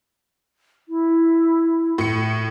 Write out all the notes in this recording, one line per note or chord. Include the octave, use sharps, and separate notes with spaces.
E4
A2 C#7